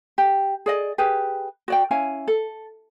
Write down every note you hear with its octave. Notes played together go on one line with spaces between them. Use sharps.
G4
G#4 D5 D#5
G4 G#4 B4
F#4 D5 G5
C#4 E4 F5 G#5
A4